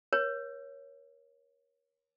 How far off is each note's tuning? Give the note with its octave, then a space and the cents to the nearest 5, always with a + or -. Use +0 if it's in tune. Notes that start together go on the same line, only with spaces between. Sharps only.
A#4 +30 C#5 +0